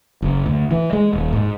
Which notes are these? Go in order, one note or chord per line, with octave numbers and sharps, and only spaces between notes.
F#1
D2
E3
G#3
D#1
G#2